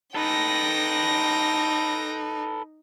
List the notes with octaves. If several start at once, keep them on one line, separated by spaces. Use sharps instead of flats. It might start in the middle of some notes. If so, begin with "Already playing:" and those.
D#4 A4 B4 G5 A#6